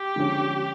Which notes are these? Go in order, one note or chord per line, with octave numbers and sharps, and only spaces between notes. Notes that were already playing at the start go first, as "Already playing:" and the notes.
Already playing: G4
D3 F3 G#3 C#4